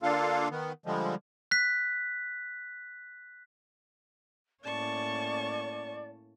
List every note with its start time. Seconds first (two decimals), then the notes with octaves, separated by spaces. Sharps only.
0.03 D3 A#3 D4 F4 A4 F5
0.51 D#3 B3
0.86 D3 F3 G3 G#3
1.51 F#6 B6
4.64 A2 A#3 C#4 D5 A5 C#6